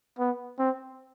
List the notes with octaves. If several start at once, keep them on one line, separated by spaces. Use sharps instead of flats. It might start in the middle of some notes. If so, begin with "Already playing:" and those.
B3
C4